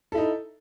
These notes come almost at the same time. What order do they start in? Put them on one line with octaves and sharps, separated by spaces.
A4 E4 D#4